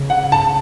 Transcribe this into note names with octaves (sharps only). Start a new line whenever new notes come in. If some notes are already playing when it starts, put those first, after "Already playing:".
Already playing: C#3
F#5
A5